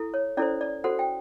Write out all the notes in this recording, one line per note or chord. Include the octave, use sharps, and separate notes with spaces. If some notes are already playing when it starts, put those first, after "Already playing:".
Already playing: E4 A4
C#5
C#4 E4 A4 C5 D5
D5
F#4 A4 C5 F#5
G5